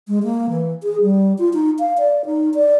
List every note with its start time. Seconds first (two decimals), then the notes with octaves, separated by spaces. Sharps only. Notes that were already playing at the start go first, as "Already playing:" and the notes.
0.08 G#3
0.23 A#3
0.50 E3
0.83 G#4
1.02 G3
1.38 F4
1.54 D#4
1.79 F5
1.98 D5
2.26 D#4
2.54 D5